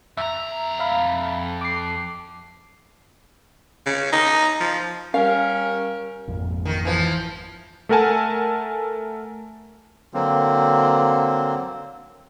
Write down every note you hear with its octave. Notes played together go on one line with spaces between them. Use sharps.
F2 E5 A#5
E5 F5 B5
D6 C7
C#3
D#4
F3
G3 C#4 A#4 F5
G#1 F2 A#2
D#3
E3 F3
A3 A4 A#4 F#5 G#5 A5
D3 F#3 A#3 C4